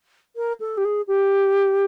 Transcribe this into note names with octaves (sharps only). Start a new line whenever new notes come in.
A#4
A4
G4
G#4
G4